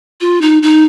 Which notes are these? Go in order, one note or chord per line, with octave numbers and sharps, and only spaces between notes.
F4
D#4
D#4